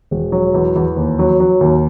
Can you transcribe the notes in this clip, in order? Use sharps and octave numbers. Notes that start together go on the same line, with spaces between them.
E1
F#3
E2
E2
D#2
F#3
F#3
D#2